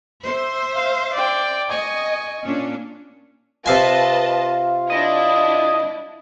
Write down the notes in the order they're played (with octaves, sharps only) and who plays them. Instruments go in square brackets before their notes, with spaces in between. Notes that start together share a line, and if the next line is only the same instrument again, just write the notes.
[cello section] C5 E5
[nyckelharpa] F5
D5 G5
[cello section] D#5 [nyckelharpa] G#5 C#6
[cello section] A#2 C#4 D4
[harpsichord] C3 F5 G#5 [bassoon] F4 [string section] B4 D#5 A5
[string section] D4 E4 [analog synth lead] D#5